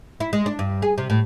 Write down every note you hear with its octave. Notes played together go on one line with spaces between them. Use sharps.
E4
G#3
D4
G2
G#4
C3
A2